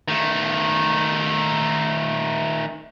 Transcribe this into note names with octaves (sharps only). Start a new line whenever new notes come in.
D#3 A3